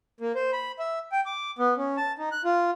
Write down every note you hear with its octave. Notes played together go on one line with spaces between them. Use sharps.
A#3
C5
B5
E5
G5
D6
B3
C#4
A5
D#4
F#6
F4